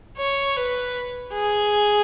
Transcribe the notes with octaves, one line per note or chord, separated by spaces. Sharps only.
C#5
B4
G#4